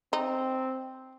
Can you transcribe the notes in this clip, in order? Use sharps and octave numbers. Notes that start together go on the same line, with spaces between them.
C4 D#4